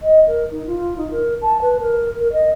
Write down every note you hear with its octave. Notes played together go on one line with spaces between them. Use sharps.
D#5
A#4
D#4
F4
D#4
A#4
A5
B4
A#4
A#4
D#5